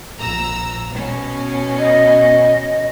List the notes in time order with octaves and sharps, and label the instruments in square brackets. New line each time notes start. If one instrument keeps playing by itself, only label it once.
[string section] A#1 A#5 E6
B2 C#4
[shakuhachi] D#5